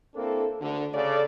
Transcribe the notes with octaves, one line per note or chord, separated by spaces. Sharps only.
A#3 C4 D4 E4 A4
D2 D3
C#3 A4 D5